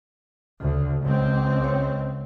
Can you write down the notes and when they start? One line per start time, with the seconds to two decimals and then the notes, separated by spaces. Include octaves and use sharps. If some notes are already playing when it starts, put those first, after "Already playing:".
0.60 D2 C#3
1.03 C#2 C4
1.64 C#5